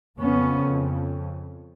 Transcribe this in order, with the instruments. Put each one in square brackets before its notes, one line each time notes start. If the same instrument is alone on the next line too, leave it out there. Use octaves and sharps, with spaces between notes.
[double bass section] F2 C#3 B3 C#4